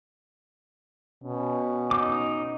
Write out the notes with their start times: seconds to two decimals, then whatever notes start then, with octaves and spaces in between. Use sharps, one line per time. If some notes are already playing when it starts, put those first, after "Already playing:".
1.24 B2 C#4
1.91 D#4 D6